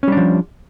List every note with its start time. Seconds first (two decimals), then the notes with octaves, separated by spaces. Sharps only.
0.03 C#4
0.08 G3
0.12 D4
0.17 F3